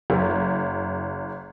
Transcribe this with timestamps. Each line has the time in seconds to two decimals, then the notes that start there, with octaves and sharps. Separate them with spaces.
0.10 F#1